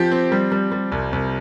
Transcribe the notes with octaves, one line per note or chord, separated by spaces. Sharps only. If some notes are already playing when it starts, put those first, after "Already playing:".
Already playing: F3 C4 G4
C4
G3
G3
G3
C2
C2